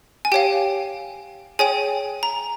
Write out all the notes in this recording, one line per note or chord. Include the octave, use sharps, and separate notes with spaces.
G#5
G4 C#5 F5 G5
G#4 C#5 G5 G#5
A#5